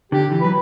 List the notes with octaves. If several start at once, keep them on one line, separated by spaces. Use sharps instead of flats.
D3 G4
E3
F#3 B4